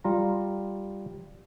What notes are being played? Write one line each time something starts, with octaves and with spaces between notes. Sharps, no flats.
G3 F4 A#5